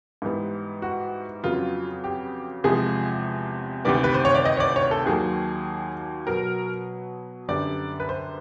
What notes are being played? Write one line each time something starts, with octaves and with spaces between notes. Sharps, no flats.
G#2 E3 G3 B3
F#4
F2 C#3 F#3 B3 F4
G4
E2 C3 F3 G#3 G#4
D2 C3 D#3 G3 B3 D5
B4
C5
C#5
D5
D#5
C#5
D5
C#5
A4
D#2 D#3 F#3 A#3 G#4
B2 F#3 B3 A#4
F#2 D3 G3 B3 D5
B4
C5